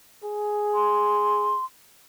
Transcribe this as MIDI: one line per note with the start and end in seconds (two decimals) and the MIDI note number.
0.24 1.58 68
0.74 1.65 84